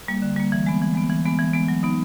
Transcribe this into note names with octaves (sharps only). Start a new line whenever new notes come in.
G3 A#3
D3
G3 A#3
E3
G#3 B3
E3
G#3 B3
E3
G#3 B3
E3
G#3 B3
F#3
B3 D#4